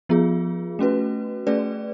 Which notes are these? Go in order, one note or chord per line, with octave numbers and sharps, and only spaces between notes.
F3 B3 F4 G#4
A3 C#4 F#4 B4
A3 C#4 G#4 B4 D5